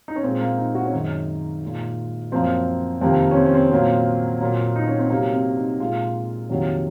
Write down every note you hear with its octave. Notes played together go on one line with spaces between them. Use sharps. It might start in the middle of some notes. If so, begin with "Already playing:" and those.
D#4
C#4
A#2 G#3 C4
A#3
D#4
F#4
C#4
F#2 D#3 G#3 D#4
A#2 G#3
F#2 F3 A#3 C4
F2 C3 D#3 A#3 C4
C#4
C4
C#4
C4
A#2 F#3 A#3 C4
A#2 F#3 A#3
D#4
C#4
C4
C3 F#3 A#3
C4
D#4
A#2 G#3 F4
F2 C3 D#3 F#3 A#3